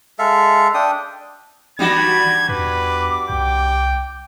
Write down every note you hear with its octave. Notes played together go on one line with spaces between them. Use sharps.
G#3 A4 E5 F5
D4 G5 D#6
E3 G3 D4 F#4 B5 G#6
E2 B4 D6
C2 G5